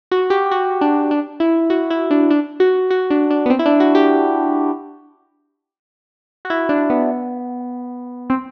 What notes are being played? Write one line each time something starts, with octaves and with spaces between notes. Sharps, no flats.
F#4
G4
F#4
D4
D4
E4
F#4
E4
D4
D4
F#4
F#4
D4
D4
B3
C4
E4
D4
F#4
G4
F#4
E4
D4
B3
C4